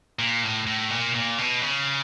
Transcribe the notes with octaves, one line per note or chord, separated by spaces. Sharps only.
A#2
A2
A2
A#2
A#2
B2
C#3